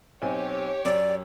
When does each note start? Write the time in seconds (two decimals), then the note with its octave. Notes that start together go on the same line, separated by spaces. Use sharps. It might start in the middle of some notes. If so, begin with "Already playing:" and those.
0.22 B1 C4 G4 C#5 G#5
0.85 F#2 D5